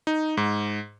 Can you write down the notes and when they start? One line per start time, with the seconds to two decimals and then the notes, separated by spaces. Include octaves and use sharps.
0.07 D#4
0.37 G#2